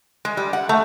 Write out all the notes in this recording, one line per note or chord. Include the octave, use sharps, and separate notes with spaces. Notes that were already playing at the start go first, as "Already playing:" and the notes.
G#3
G3
F#5
A3